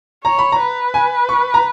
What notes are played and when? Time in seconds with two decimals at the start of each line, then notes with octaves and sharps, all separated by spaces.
0.24 C#5 A#5
0.39 B5
0.52 A#5
0.59 B4
0.94 G#5
1.29 C#6
1.54 A#5